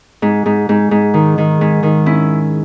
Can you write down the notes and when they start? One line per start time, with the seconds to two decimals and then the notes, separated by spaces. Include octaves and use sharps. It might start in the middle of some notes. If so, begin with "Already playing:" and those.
0.22 G#2
0.46 G#2
0.69 G#2
0.91 G#2
1.14 D#3
1.38 D#3
1.61 G#2
1.83 D#3
2.06 C#4 E4